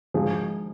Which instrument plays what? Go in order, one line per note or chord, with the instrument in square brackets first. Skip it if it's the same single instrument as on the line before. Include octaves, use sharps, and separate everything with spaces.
[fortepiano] G#1 G#2 F3 G#4